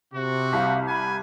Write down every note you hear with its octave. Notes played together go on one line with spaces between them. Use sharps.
C3 F#4
C2 F5
G#5 B5